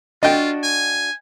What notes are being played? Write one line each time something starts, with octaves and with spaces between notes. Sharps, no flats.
D4 F4 F#4 D#5 G5
G#5